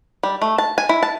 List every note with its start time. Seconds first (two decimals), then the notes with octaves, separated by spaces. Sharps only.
0.23 G3
0.42 A3
0.58 A5
0.78 G#5
0.89 E4
1.03 A5